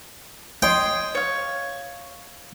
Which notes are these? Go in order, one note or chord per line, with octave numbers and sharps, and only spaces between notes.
C#5 D#5 G5 C6
C#5 F5